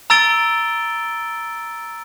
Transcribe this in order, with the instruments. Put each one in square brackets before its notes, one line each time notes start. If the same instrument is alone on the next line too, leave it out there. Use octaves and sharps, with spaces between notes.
[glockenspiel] A#5 E6 A6 D7 G7